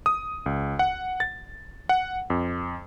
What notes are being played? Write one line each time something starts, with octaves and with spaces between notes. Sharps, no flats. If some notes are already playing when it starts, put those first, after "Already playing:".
D#6
C#2
F#5
A6
F#5
F2